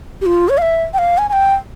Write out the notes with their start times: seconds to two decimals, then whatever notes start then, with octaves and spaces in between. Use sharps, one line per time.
0.21 G4
0.26 F4
0.49 C#5
0.58 F5
0.62 E5
0.94 G5
0.98 F5
1.18 G#5
1.29 G#5
1.33 G5